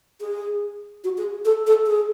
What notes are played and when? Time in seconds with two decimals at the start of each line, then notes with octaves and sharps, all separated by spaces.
0.21 G#4
1.04 F#4
1.18 G#4
1.45 A4
1.67 A4
1.87 G#4